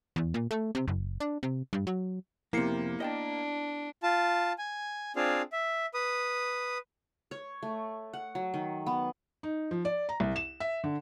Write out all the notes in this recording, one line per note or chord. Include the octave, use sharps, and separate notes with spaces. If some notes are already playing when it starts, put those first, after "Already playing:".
E2
A#2
A3
C3
F#1
D4
C3
G2
F#3
F2 C3 A#3 B3 E4 C7 C#7
D4 D#5 G5 A5
F4 A5
G#5
C4 D4 F4 G#4 F5
E5
B4 D#6
C#5
A3
F#5
F#3
D#3
B3
D#4
F3
D5
A#5
C2
E7
E5
D3